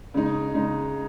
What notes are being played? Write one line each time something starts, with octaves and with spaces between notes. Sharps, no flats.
C#3 G#3 D#4
C#3 G#3 D#4